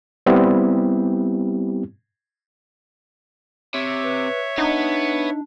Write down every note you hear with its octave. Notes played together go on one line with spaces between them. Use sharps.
G3 B3 C4 E4 G4
C3 C#5 E5
B4
B3 D4 D#4